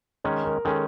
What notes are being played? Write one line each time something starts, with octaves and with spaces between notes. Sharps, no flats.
D#3 G#3 C#4 A#4
A#4
D#3 G#3 C#4 A4